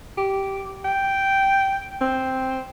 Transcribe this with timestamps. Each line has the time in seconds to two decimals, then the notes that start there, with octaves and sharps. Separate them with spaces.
0.17 G4
0.85 G5
2.01 C4